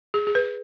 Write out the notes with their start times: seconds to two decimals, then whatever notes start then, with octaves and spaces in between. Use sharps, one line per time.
0.14 G#4
0.27 G#4
0.35 B4